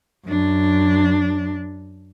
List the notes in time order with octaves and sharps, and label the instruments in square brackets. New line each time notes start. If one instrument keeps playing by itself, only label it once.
[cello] F#2 D4